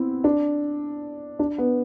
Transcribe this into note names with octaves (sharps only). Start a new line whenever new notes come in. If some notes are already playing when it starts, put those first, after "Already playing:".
Already playing: B3 C4 E4
D4
D4
B3